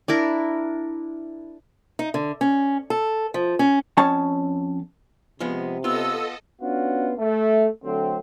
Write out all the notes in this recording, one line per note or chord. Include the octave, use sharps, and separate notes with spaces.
D4 E4 A#4
D#4
D3
C#4
A4
F3
C#4
F2 C#4 C#5 A5
C3 F3 G#3 B3
B3 F4 A4 D#5 E6
B3 C#4 D4 F4 F#4
A3
D3 F#3 A3 C4